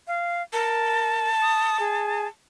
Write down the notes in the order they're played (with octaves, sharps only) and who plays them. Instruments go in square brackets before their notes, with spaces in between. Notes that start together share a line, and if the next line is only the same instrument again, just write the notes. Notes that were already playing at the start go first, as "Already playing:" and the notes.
[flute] F5
[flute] A#4 [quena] A5
[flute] D#6
G#4